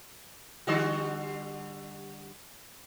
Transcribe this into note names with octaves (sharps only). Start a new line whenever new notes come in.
D3 G3 F#4